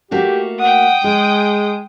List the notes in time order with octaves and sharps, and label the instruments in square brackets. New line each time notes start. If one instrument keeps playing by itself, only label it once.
[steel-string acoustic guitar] A3 A#3 F#4 [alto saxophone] G4
[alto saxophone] F#5 [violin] G5 D#6
[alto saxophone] G#3 [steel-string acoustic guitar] G#4